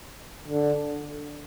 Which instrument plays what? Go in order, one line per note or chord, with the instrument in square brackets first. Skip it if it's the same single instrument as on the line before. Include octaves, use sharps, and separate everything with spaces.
[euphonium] D3